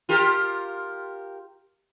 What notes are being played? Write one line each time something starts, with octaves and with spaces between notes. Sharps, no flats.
F4 G4 A#4